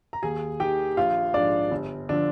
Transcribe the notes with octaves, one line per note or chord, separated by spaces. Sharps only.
A#5
D#2 G#4 G#5
D#3 G4 G5
A#1 F4 F5
G#2 F3 D4 D5
G1
D3 F3 D4